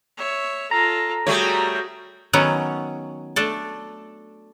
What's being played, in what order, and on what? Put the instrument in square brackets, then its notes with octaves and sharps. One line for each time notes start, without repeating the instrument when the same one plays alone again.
[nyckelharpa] C#5 E5
[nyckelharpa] F4 A4 [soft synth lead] A#5
[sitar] G3 A3 C#5 [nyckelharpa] F#4 G#4
[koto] D#3 F#3 B3 C#4
A3 D4 A4